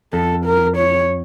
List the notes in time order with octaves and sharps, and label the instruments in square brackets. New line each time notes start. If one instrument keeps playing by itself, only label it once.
[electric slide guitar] F2 [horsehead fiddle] A4
[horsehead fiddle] A#4
C#5